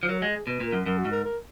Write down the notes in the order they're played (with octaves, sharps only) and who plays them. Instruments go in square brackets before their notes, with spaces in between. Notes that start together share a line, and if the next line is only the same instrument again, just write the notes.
[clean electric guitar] F3
[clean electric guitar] F#3 [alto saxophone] A#4
[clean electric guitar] G#3 [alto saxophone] F#4
[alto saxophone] G#4
[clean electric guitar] B2 [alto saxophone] B4
[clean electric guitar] A#2
[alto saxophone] A#4
[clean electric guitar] F#2
[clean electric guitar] F#2 [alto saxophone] A#4
[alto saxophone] F#4
[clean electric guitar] G#2
[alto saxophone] A#4
A#4